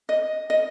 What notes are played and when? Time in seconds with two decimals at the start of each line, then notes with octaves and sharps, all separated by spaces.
0.09 D#5
0.50 D#5